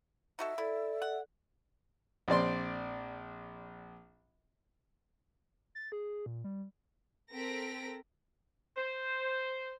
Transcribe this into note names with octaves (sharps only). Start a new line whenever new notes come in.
D#4 F#4 A4 E5
E4 A4 D5
F#5
A#1 C4 D5 C6
A6
G#4
A#2
G3
C4 A4 A#4 A#6 B6 D7
C5